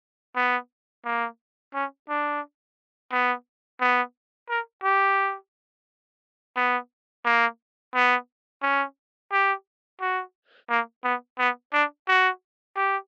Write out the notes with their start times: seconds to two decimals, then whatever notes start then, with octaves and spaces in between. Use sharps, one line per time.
0.36 B3
1.05 A#3
1.74 C#4
2.09 D4
3.12 B3
3.81 B3
4.49 A#4
4.84 G4
6.56 B3
7.25 A#3
7.95 B3
8.62 C#4
9.32 G4
10.01 F#4
10.70 A#3
11.04 B3
11.39 B3
11.73 D4
12.08 F#4
12.76 G4